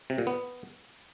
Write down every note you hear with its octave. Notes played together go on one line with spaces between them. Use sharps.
C3
A#2
B3